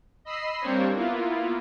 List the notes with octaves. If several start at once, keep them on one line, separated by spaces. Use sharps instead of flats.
D#5 B5 E6 C7
G3 A#3 C4 D4 C5 C#5
A#3 B3 E4 F4